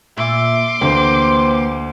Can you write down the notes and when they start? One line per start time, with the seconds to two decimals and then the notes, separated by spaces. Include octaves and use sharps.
0.18 A#2 E5 C6 D6
0.81 D2 E3 A#3 G4 A#4 C5